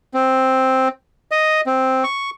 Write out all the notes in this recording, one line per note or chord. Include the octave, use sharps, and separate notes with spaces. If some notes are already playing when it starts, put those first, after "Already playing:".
C4
D#5
C4
C#6